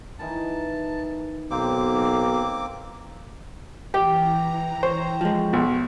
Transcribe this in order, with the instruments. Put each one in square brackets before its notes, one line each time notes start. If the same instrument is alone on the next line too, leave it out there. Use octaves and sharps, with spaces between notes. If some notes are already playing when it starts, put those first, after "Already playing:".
[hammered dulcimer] D#3 E3 D#4 [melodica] A5
[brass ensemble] B1 B2 [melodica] A#3 C4 D6 [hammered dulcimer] C5 G5
[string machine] E3 A#5 [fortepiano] G4 [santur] G5
[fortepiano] C5 [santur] C#5
[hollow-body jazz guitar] F3 G#3
[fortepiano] B1 [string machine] F#4 G4